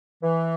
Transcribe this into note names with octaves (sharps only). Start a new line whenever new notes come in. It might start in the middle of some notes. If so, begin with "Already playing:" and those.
E3